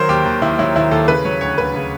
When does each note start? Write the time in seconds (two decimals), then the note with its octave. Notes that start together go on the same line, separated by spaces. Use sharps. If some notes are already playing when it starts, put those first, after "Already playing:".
Already playing: D#3 F#3 A#4 C5
0.09 D#2 G4
0.25 D#2
0.42 D#3 E4
0.59 F#3 E4
0.76 D#2 E4
0.91 D#2 A4
1.08 C#3 B4
1.25 F#3 C#5
1.41 D2 C#5
1.58 D2 B4
1.74 C#3